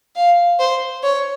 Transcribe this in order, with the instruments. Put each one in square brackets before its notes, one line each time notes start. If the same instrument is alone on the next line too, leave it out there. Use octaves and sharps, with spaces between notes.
[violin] F5
C5
C#5